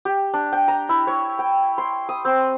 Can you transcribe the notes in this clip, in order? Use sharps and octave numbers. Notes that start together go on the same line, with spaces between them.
G4
D4
G5
A#5
E4
C#5
G5
C6
D#6
C4